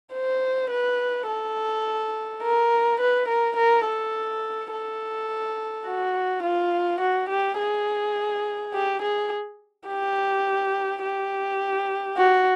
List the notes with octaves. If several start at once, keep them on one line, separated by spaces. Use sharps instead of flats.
C5
B4
A4
A#4
B4
A#4
A#4
A4
A4
F#4
F4
F#4
G4
G#4
G4
G#4
G4
G4
F#4